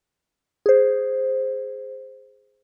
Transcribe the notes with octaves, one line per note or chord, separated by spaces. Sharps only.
G#4 C5